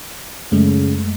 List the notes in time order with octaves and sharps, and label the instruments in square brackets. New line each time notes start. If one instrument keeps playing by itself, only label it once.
[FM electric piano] F#2 G#3 A3 [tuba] C#3